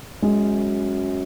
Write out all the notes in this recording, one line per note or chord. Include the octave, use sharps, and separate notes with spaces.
F#2 G#3